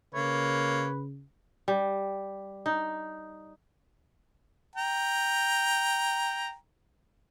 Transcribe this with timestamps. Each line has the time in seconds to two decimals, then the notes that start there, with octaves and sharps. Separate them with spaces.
0.15 C#3 A#3 B4 C#5
1.68 G3
2.66 D#4
4.76 G5 A#5